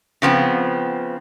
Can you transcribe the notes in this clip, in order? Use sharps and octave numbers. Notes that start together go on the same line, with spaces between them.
C#3 F3 B3 C4